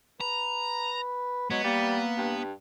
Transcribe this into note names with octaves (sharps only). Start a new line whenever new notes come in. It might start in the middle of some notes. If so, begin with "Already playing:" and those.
B4 A#5
F#3 G#3 B3
G3 A#3
G2